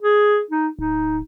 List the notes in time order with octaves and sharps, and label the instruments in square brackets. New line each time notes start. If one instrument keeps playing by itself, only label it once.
[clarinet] G#4
D#4
[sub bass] D1 [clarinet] D#4